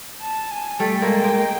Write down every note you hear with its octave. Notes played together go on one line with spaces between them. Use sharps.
A5
G#5
G3 A3 G5
G#3 A#3
G#3 A#3